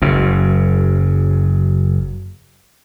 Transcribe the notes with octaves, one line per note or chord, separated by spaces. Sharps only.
F#1 F#2